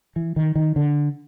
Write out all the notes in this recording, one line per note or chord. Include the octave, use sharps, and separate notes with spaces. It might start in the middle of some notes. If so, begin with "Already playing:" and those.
E3
D#3
D#3
D3